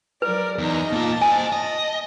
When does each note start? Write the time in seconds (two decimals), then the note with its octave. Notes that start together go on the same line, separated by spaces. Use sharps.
0.22 F#3 A#4 B4 D5
0.58 E2 D#4 D#5 A#5
0.92 A#3 F4 A5
1.22 C5 D#5 G#5
1.52 D#5